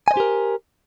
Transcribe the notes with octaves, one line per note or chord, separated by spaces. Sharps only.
G4 A#4 C5 D#5 G#5